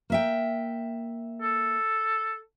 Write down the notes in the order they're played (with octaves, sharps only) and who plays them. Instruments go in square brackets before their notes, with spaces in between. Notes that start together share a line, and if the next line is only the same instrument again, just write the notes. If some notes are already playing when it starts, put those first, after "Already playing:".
[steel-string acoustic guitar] A#3 E5 G5
[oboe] A4